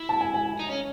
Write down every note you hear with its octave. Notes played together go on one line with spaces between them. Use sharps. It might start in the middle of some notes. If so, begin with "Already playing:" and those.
Already playing: E4
A5
G#5
G#5
D#4
C#4